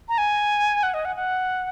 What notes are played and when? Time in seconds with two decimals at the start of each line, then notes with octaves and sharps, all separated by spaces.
0.09 A#5
0.18 G#5
0.83 F#5
0.94 D#5
1.05 F#5
1.16 F#5